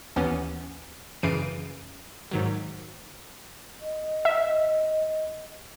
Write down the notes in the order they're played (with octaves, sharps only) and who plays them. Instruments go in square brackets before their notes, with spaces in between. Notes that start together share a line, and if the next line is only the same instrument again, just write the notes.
[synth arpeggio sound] D#2 E3 B3 C#4
F#2 C#3 E3 C7 D7 D#7
G#2 D#3 F#3
[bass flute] D#5
[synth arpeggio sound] E5